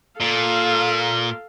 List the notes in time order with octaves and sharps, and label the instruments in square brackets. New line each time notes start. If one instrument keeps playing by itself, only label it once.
[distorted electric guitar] A#2 [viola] A4 F5